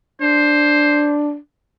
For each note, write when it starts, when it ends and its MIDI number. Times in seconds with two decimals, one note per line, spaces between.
0.22 1.37 62
0.22 1.16 72